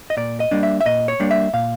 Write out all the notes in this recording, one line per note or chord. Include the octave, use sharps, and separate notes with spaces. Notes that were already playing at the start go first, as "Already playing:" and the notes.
D#5
A#2 D5
D#5
G3 A#3 D4
E5
E5
A#2 D#5
C#5
G3 A#3 D4
E5
A#2 F5